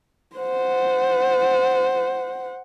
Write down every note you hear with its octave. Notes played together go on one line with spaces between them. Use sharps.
C5 F#5